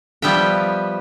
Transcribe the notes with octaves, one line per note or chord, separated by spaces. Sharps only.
F3 G3 B3 E5 G5